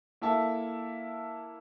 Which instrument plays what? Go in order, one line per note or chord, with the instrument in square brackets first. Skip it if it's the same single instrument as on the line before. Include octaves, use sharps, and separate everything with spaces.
[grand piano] A#3 E4 A4 E5 A5